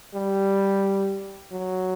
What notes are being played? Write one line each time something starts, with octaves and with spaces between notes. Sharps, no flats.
G3
F#3